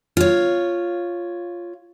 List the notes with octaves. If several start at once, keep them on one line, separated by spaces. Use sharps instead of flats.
F4 C#5